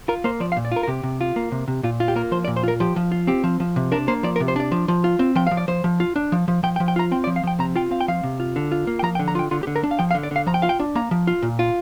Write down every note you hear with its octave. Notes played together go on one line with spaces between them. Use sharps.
F4 A#4
A#3 C5
F3 D5
F5
A#2
D5
F4 A#4
A#4
C3 G4
C3
F4
A#3
C3
C3
A#2 F4
F4
G4
A#3 A#4
F3 C5
D5
A#2
C5
F4 A#4
F3 G4
F3
F4
C4 G4
F3
F3
C3
D4 A#4
A#3 C5
F3 D5
A#4
C3
C5
D4 D5
F3
F3
F4
C4
F3 G5
F3 F5
D5
F3 C5
F3
F4
D4
F3
F3
F3 G5
G5
F3
G5
F4 A#5
C4 G5
D5
F3
F5
F3 G5
C3 A#5
F4 G5
C4 F5
G5
F3 F5
C3
F4
D3
F4
A#3
G5
F3 A#5
G5
D3
A#5
F4 G5
D3 F4
G4
D3
A#4
D4
F5
F3 G5
F5
D3
D5
D3 F5
F3 A#5
G5
F4 F5
G5
D4
A#3 A#5
F3
F4
A#2
F4